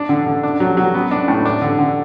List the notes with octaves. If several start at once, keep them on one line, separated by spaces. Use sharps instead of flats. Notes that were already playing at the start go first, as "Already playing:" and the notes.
Already playing: D4
D3
D3
D4
F#3
F#3
B3
D4
A2
D4
D3
D3